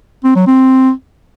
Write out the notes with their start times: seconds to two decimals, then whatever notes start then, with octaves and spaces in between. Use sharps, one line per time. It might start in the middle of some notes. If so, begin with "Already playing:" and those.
0.24 C4
0.35 F#3
0.47 C4